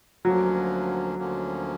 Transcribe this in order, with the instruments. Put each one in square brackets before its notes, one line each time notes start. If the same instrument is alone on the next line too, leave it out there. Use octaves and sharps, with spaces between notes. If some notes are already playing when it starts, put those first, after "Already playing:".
[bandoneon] D2 D3 F3 A#3 C#4 [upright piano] F#3
[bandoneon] D2 D3 F3 A#3 C#4